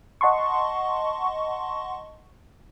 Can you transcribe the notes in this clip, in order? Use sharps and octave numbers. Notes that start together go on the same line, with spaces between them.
D#5 F#5 A5 C6 C#6